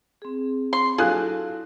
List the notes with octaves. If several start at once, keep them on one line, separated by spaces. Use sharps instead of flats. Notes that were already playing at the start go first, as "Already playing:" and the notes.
C4 G#4
C6
F#3 D4 E4 F4 G#4 A4 F#6